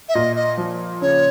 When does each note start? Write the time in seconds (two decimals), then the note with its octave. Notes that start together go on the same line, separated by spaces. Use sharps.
0.09 E5
0.14 A#2 D#5
0.36 D#5
0.57 F3
1.02 C#3 C#5